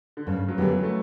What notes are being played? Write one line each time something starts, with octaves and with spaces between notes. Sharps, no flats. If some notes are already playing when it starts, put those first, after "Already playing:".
D3
G2 C#3
F#3
D3 E3 G3 B3
F#3
A3